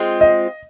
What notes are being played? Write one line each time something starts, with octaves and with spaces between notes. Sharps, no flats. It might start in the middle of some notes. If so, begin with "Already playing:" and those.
Already playing: G#3 C4 F4
D#5